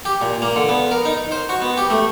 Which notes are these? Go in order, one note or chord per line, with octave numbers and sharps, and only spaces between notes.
G4
A#2
A#3
D3
B3
A#4
D#4
C5
F#4
B3
G4
A3